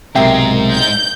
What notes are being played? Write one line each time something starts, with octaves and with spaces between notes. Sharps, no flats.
B1 G#2 C3 G#3 A#4 E5 G5 C7
G6